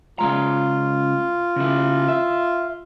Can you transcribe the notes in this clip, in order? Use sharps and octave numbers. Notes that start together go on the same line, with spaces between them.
C#3 G#3 F4 A#5
C#3 E4
E5